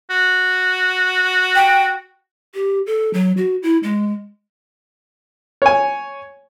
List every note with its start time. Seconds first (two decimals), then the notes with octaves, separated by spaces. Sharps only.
0.10 F#4
1.55 G5
2.54 G4
2.86 A4
3.14 F#3
3.37 F#4
3.63 E4
3.83 G#3
5.62 C#5 G#5